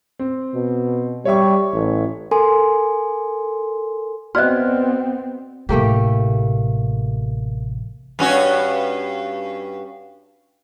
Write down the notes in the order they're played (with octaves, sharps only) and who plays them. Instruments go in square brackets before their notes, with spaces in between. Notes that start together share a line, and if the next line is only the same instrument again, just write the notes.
[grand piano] C4
[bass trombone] B2
[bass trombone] G3 [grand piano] C#5 E5 C#6
[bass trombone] A1
[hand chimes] A4 A#4 G#5 C6
[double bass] B3 C4 [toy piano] F#4 D5 D#5 [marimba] F6 F#6
[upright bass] A1 C3 [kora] A3 A#3 G4
[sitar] G2 C#4 F#4